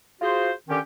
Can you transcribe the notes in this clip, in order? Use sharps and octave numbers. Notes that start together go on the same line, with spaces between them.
F4 F#4 G#4 C5
D3 D#3 C#4 G4